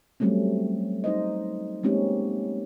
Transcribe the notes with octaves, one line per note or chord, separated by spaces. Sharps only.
F#3 G3 A3 C4 C#4
D#4 C5 D#5
G#3 A#3 C4 C#4 D#4 G4